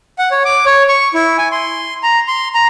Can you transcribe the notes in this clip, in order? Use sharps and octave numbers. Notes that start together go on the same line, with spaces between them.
F#5
C#5
D6
C#5
C#6
E4
G#5
C6
A#5
C6
A#5